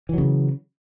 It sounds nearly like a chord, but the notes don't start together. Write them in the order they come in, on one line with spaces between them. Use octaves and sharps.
E3 F#3 C#3